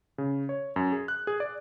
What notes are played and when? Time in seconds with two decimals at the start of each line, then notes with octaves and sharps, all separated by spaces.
0.18 C#3
0.49 C#5
0.76 F#2
0.92 G#4
1.08 F#6
1.27 G#4
1.40 D5